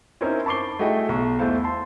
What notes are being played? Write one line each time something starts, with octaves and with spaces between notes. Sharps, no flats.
C4 C#4 D#4 E4 A#4 C5
A5 B5 C#6 D6 C7 G7
A3 E4 F#4 G#4 D#5 G5
B1 C#6
E2 A3 E4 C5 F5
A5 C6